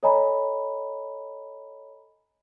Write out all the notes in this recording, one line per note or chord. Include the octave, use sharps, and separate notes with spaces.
A4 C#5 D#5 G#5 A#5 B5